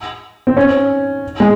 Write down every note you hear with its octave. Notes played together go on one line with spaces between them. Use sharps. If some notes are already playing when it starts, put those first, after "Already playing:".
C4
C#4
G#3